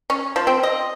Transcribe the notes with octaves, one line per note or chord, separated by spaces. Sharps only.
C#4
F3
C4
D#5